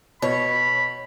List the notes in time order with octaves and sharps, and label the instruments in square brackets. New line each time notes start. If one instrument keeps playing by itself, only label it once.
[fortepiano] B2 [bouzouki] C#5 [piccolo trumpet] B5